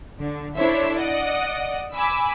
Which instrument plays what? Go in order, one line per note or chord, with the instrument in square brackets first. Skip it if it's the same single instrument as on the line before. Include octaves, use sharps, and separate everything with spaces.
[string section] D3
D4 E4 A4 C5 C#5 E5
D5 D#5 F#5 D#6
G#5 B5 D6 E6